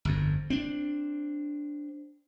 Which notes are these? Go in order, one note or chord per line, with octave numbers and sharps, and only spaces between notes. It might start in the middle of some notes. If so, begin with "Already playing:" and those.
G1 F2
C4 D4